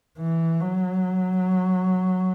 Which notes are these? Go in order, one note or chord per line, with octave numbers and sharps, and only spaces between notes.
E3
F#3